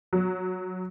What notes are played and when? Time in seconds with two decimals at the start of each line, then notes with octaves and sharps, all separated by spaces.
0.13 F#3